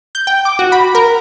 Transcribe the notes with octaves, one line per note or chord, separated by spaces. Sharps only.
G6
G5
D6
F#4
B5
A#4